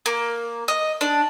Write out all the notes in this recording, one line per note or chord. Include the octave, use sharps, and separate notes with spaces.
A#3
D#5
D4